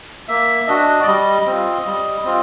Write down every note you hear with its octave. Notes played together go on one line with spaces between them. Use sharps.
A#3 E5
D4 F#4 D#5
D5
G3 D#5
C4 F4
G3
C4 F4